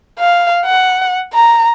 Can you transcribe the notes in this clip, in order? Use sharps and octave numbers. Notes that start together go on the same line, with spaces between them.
F5
F#5
A#5